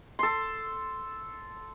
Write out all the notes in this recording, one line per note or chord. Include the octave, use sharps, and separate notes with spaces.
A4 C6